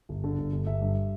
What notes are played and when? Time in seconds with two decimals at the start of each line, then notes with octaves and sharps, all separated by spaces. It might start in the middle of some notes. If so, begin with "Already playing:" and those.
0.09 G1
0.24 D3
0.38 G1
0.52 G1
0.67 G1 E5
0.81 G2